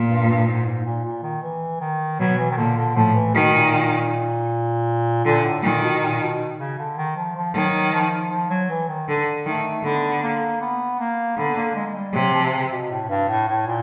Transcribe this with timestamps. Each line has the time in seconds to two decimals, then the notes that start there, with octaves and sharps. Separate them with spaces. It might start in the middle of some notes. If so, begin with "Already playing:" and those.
Already playing: A#2
0.09 G2
0.28 G2
0.47 G#2
0.66 G#2
0.85 A#2
1.04 A#2
1.23 D#3
1.42 E3
1.81 D#3
2.19 B2 F#3
2.38 E3
2.51 D#3
2.57 A#2 D3
2.77 D3
2.95 A2 F3
3.15 E3
3.34 B2 D#3
3.54 A#2
5.25 A#2 D3
5.44 A2
5.63 A#2 D#3
5.82 B2
6.02 A#2
6.21 B2
6.59 C#3
6.78 D3
6.97 D#3
7.16 F3
7.36 F3
7.54 D#3 F#3
7.93 F3
8.31 F3
8.50 F#3
8.69 E3
8.88 D#3
9.08 D3
9.46 D#3 A3
9.84 D3 B3
10.22 A#3
10.61 B3
10.99 A#3
11.37 D3 B3
11.57 A#3
11.76 G#3
11.87 G#3
11.94 G3
12.13 C3 F#3
12.33 F3
12.52 C#3
12.71 B2
12.90 A2
13.09 G2
13.29 A2
13.48 A2
13.67 A#2